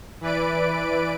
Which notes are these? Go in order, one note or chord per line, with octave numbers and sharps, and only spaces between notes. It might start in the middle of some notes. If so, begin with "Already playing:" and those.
E3 B4 D5 D7